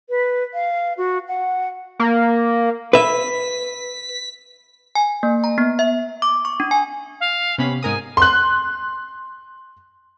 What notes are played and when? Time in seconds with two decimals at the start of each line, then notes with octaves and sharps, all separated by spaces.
0.10 B4
0.54 F5
0.97 F#4
1.28 F#5
1.99 A#3
2.93 B4 E5 B6
4.95 G#5
5.23 A#3
5.44 A#5
5.58 B3
5.79 E5
6.22 D6
6.45 C#6
6.60 D4
6.71 G#5
7.20 F5
7.58 C3 B3 C#4 B5
7.83 G#2 A#4 G#5 D#6
8.17 C6 F#6